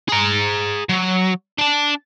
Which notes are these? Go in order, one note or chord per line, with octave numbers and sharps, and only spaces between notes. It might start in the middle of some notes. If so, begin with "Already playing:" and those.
G#4 A#5
F#3
D4 A5